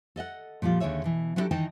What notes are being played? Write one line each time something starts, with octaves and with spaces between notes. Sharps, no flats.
A4 D#5 E5 F#5
A#2 F3 G3 F4
D#2 D3 G#4 C#5 E5
B2 E3
F#3 B3 D4 E4 G4 A4
D#3 E3 D#4 D#5 G5 A5